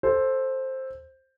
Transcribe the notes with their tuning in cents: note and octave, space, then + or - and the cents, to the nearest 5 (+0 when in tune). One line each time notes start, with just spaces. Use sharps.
A4 +0 C5 +10